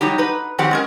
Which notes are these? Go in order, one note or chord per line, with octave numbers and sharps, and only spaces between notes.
F#3 G3 D#4 G4
D#4 B4
D#3 F3 F#3 C4 G4 F#5
G#3 C#4 A#4